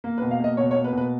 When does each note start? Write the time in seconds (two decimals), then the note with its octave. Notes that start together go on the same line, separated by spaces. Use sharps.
0.04 A#3
0.18 B4
0.22 B2
0.31 F5
0.40 A#3 D#5
0.57 B2 C#5
0.71 C#5
0.76 A#3
0.84 B4
0.92 B2
0.97 B4